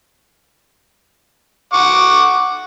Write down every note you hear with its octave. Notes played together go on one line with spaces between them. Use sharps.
F#5 C#6 D6